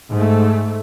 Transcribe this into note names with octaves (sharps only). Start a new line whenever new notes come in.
G#2 A3